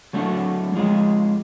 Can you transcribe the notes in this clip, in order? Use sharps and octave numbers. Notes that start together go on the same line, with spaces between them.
F#3 A3 D4 F#4
F2 D3 F3 G#3